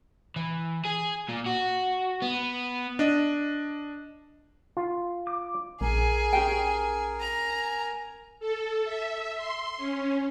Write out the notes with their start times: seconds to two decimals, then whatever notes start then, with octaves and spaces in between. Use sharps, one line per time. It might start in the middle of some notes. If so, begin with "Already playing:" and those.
0.36 E3
0.85 G#4
1.29 A#2
1.46 F#4
2.22 B3
2.99 D4 D#5
4.77 F4
5.27 D6
5.81 A#1 G#4 A#4 G#5
6.33 C#4 G4 G5
7.21 A#5
8.40 A4
8.84 E5
9.36 C6
9.78 C#4